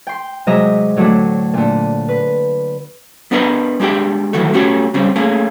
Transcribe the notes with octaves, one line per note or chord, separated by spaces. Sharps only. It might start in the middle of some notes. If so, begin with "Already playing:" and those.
G5 C6
C3 F#3 G#3 D#5 E5 A#5
A2 D3 F#3 A3 D4
A#2 D3
B4
B3 D4 A#4 B4 D#5 A#5
G#3 D4 G4 E5 G5
D#3 E3 F#3 A3
A3 C#4 F#4 G4 C#5
C#3 G3 C4 C#4
A3 A#3 C#4 G#4